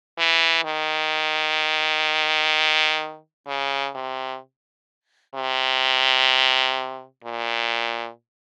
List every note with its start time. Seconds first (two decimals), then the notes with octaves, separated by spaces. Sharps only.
0.18 E3
0.64 D#3
3.47 C#3
3.95 C3
5.35 C3
7.24 A#2